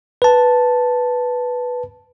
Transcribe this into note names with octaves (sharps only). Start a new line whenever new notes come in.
B4 A5